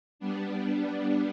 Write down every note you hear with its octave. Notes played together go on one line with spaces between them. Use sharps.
G3 B3 D4